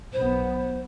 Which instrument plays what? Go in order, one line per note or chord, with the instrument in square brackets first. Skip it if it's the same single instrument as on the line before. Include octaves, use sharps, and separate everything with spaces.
[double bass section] B1 B3 [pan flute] C5